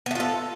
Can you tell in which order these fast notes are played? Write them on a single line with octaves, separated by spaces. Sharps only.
B3 A3 F4 A4